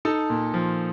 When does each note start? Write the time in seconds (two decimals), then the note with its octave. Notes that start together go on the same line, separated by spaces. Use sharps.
0.05 D#4 A4 A5
0.30 A#2
0.54 F3